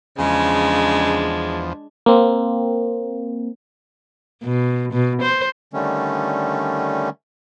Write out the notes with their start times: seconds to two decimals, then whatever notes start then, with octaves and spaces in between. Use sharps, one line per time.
0.18 E2 C#3 F3 G#3 D4
2.06 A#3 C4
4.44 B2
4.93 B2
5.22 C5
5.73 D3 D#3 G3 A3 C#4